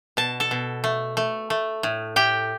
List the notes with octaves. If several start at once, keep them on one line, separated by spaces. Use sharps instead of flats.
B2 A5
A4 A5
B2
A3
A3
A3
A2
A2 G4 G5